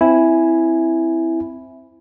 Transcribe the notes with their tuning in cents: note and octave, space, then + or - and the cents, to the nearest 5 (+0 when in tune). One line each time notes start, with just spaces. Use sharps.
C4 -10 E4 +0 G#5 +0